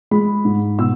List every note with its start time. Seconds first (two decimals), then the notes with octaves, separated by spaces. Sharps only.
0.11 G#3 B5
0.45 G#2
0.79 B2 E6